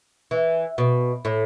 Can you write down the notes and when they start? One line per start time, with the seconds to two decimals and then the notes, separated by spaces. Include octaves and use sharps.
0.31 E3
0.78 B2
1.25 A2